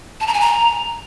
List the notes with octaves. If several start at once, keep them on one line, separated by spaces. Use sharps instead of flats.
A5
A#5
G#5
A#5